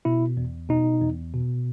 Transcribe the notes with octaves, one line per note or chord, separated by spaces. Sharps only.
B2 E4
E2
B2 D#4
E2
B2